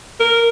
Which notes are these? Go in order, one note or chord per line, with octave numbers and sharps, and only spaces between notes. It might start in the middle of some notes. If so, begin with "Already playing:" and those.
A#4